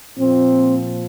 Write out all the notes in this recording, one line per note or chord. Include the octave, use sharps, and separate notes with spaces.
A#2 F3 C4